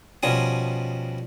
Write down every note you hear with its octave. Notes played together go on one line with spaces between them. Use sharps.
B2 F3 G3 C#4 D#6